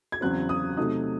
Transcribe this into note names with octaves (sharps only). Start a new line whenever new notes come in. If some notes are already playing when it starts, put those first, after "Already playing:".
G#6
E2 C#3 F#3 C4 F#6
D#6
C3 F#3 A3 D#4 D#6